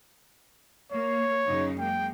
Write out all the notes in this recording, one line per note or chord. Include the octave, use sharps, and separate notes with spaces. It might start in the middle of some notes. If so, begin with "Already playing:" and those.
A#3 C#5
F#2 C#3 D#4
G#3 A#3 G5